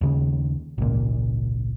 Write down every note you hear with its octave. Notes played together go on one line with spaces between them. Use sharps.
D#2 C#3
G#1 C#2 A#2